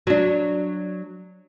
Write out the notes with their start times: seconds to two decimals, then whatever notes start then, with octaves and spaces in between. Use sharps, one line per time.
0.07 F#3 D4